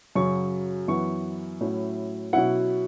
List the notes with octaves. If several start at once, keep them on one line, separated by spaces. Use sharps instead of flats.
F#2 C#3 F#3 C#6
F#2 E3 B3 C#6
A2 F#3 C#4 E4
B2 F#3 C#4 E4 F#5